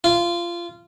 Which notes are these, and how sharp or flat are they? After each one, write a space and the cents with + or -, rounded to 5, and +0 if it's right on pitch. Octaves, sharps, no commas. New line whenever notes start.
F4 -20